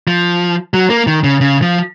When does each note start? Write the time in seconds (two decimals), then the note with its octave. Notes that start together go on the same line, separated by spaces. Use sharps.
0.08 F3
0.74 F#3
0.90 A#3
1.07 D#3
1.24 C#3
1.41 C#3
1.62 F3